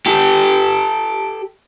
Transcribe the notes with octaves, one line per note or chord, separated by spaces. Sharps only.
G4 A4